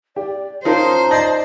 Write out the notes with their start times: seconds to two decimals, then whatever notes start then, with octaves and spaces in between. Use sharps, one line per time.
0.16 G4 D5
0.65 C#4 D#4 F4 A#4 C5 A5
1.11 D5 D#5 G6 A#6